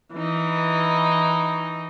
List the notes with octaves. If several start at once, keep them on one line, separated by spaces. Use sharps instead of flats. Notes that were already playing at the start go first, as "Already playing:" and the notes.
E3 D#4